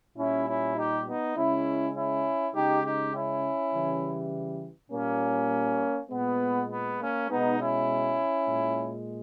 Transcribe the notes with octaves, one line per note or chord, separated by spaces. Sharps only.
A#2 G3 C#4 E4
C#4 E4
D#4 G4
B3 D#4
C#3 G#3 C#4 E4
C#4 E4
C#3 G#3 D#4 G4
D#4 G4
C#4 E4
C#3 E3 G3
A#2 G3 A#3 C#4
A#2 G#3 B3
B3
A#3 C#4
B2 G#3 B3 D#4
C#4 E4
A#2 G#3